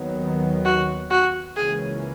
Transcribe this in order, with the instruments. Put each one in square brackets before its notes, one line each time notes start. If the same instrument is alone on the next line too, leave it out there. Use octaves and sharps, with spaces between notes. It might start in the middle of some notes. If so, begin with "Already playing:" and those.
Already playing: [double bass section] D#2 D#3 F#3 B3
[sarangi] F#4
F#4
[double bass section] C#2 C#3 E3 A#3 C#4 [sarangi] G#4